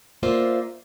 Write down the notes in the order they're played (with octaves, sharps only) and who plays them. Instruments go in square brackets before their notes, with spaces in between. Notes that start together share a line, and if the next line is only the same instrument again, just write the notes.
[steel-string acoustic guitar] A#3 F4 C5 D5 E5